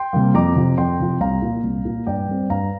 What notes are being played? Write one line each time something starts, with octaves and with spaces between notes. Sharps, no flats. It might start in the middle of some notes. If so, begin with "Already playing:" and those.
Already playing: G5 C6
C3 G3 A#3
F2 A#5 D6
C3 F3
F2 G5 C6
C3 F3
C2 F5 A#5
A#2 A#3
C2
A#2 A#3
G2 D5 G5
G3 C4
G2 F5 A#5